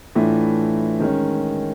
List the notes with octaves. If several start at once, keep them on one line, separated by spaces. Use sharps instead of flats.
A2 E3 A3 D4 F4
D#3 G#3 C#4